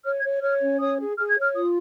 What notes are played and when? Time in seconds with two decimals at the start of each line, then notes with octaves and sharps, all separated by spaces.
0.04 C#5 F6
0.17 G#6
0.24 C#5
0.42 C#5 F6
0.62 C#4
0.80 C#5 D#6
0.99 G#4
1.17 G#4 F6
1.30 G#6
1.37 C#5
1.43 F6
1.54 F4 D#6